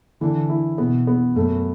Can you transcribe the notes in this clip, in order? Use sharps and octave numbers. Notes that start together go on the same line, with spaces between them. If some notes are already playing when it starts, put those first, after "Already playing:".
D3 E3
E4
B2 B3
B3
F#2 A3